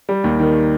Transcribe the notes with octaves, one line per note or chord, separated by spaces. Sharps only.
G3
D#2
D#3